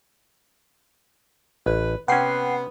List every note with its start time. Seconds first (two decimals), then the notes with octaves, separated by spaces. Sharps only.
1.66 A1 B4
2.08 C3 B3 C#4 F#5 G5 C7